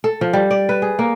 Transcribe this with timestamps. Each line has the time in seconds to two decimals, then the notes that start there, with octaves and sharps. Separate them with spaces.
0.04 A4
0.21 F3
0.33 G3
0.51 D5
0.69 B4
0.82 G#4
0.99 A#3